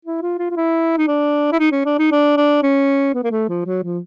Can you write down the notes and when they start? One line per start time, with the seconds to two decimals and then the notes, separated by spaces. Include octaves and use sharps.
0.05 E4
0.22 F4
0.39 F4
0.51 F4
0.57 E4
0.98 D#4
1.08 D4
1.52 E4
1.60 D#4
1.72 C#4
1.85 D4
1.99 D#4
2.12 D4
2.37 D4
2.63 C#4
3.14 B3
3.24 A#3
3.31 A3
3.49 F3
3.66 F#3
3.84 F3